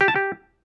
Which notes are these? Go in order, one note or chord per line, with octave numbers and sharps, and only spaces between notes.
G4
A5
G4